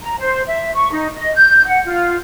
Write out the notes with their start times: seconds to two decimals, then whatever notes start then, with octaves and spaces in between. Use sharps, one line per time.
0.01 A#5
0.18 C5
0.46 E5
0.74 C#6
0.91 D#4
1.15 D#5
1.34 G6
1.65 F#5
1.86 F4